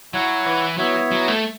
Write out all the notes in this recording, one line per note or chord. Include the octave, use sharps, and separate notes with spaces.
F#3 E4 C#5 F#5
E3
F#3 B3 E4 C#5 E5
F#3
A3